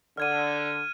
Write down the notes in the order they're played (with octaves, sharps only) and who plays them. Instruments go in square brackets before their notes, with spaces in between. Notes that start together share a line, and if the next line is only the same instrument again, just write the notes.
[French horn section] D3 [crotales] F6 G#6 D#7